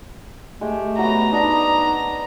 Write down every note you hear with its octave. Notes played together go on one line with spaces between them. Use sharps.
G#3 A3 G4
F#3 B3 A#5
D4 D#4